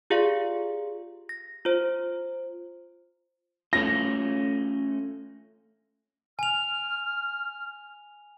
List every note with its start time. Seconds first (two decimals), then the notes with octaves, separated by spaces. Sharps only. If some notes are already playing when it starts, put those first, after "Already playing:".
0.10 F4 G4 G#4 D5 F5
1.29 A#6
1.65 F4 C5
3.73 A3 C#4 F4 A#6
6.39 G#5 F6 F7